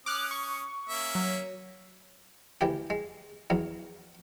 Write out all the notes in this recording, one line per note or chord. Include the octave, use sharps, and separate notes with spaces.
C#4 D6 D#6 F6 F#6
C#6
A#3 C#4 E5
F#3
D2 E3 G4
G#3
E2 F#3